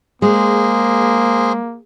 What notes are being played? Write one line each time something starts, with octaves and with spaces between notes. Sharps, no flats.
G#3 A#3 G#4 C5